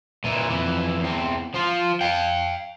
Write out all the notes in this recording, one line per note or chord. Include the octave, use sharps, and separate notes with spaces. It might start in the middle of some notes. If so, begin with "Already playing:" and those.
A#2 E3
F2 E3
E2 C4
F3 F4
F5 G5